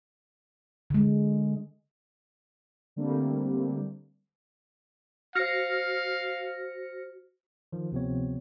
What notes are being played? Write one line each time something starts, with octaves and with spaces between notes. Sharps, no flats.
D3 G#3
D3 G3 A3 A#3 C4 D4
F#4 C5 F5 F6 A#6 C#7
D#3 F3
D2 C3 F3 B3 C4 C#5